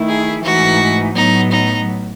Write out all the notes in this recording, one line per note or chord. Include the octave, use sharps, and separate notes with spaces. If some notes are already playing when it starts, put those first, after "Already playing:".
Already playing: D#3 A3 E4
G#4
G#2 E3 A3 D#4 F#4
A2 F#3 B3 D#4
D#4